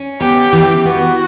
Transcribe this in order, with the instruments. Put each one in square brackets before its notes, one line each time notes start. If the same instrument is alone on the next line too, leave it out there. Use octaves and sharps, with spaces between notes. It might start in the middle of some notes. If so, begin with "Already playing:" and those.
Already playing: [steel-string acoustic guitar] C#4
[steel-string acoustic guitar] B3 [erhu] G4
[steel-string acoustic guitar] E3
[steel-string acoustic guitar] B3 [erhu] F#4